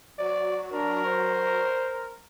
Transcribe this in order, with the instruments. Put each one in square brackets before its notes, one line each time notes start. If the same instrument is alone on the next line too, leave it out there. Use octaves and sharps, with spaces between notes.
[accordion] F#3 F#4 [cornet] D5
[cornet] D4 [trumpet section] A#4
[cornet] C5